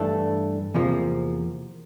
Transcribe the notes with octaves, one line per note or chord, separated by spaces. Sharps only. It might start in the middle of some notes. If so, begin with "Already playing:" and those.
Already playing: G2 E3 A3 D4 A4
E2 C3 F3 A#3